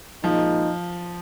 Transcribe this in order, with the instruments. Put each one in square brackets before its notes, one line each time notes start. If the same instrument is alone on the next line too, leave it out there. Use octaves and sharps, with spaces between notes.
[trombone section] A#2 G#3 D#4 [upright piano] F3